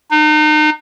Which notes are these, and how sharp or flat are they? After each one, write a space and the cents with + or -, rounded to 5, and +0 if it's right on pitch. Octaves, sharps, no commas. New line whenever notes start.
D#4 -35